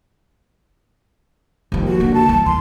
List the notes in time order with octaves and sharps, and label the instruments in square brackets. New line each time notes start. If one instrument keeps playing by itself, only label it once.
[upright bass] D#2 F3
[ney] F#4
[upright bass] D3 A#3
[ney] A5
[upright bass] E3
[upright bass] D#2 [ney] C6